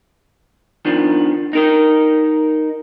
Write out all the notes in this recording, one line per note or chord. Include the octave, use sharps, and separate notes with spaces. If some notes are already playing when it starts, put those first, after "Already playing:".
D#3 F3 B3 D4
D#4 A#4 D#5